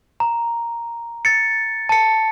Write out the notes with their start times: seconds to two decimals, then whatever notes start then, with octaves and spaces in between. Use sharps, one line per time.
0.20 A#5
1.25 A6 C#7
1.89 A5 C#7